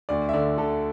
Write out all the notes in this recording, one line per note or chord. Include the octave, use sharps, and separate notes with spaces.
D2 D5
E5
D3 D5
D3 A4